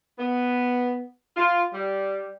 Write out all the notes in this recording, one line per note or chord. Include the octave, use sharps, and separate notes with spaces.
B3
F4
G3